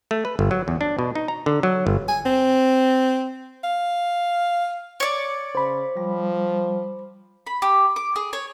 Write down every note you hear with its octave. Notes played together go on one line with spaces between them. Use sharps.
A3
B4
G1
F#3
E2
D4
B2
D#4
A#5
D3
F#3
G1
G#5
C4
F5
C#5 D5 C#7
C#3 C5 B5
F3 G3
B5
G4
D6
G#4
C#5